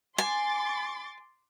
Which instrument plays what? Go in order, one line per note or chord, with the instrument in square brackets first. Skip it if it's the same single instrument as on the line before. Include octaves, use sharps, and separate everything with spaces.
[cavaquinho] G#5 [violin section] C6 D6 A6